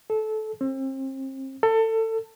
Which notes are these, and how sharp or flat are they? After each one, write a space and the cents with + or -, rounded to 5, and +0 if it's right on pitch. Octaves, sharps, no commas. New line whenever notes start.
A4 -20
C4 +35
A4 +25